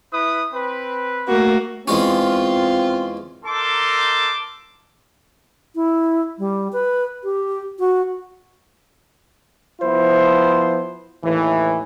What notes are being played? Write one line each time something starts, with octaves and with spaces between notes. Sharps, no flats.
E4 B4 D#6
C4 B4
A3 A#3 F#4
E2 G#3 C4 C#4 F4
D#4 A4 A#4 A5 C6 D6
E4
G3
B4
G4
F#4
F3 B3 E4 C5
D#2 A2 E3